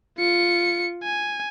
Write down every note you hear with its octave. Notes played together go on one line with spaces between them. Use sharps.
F4 C#7
G#5